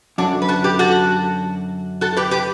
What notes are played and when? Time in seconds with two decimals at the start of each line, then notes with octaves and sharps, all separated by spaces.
0.18 F#2 D3 F#3 D4 F#4
0.42 B4
0.49 F#4 A4
0.64 G4 B4
0.79 F#4 A4
2.01 F#4 A4
2.17 G4 B4
2.31 G4 B4